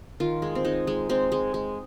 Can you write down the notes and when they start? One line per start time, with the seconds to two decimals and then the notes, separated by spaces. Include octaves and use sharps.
0.20 D#3 F4
0.42 G#3
0.55 C4
0.65 G#3 D#4
0.87 G#3
1.09 G#3 C4
1.32 G#3
1.54 G#3